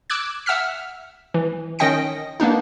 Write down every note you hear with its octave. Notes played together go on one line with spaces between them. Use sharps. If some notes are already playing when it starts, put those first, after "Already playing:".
D6 E6 F#6 G#6
E5 F#5 E6 F6 B6
E3
D#3 C#4 D#5 G5 A#6 C#7
A#3 B3 D4 D#4